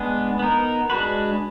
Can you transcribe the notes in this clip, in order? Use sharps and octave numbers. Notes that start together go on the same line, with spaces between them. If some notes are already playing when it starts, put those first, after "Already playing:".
Already playing: G#3 B3 D4 G#4
B3 D#4 A#4
G#3 D4 F#4 B4